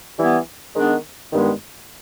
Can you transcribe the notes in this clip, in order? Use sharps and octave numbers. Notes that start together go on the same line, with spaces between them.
E3 G3 B3 E4
D#3 G#3 B3 D4
G2 D#3 G#3 B3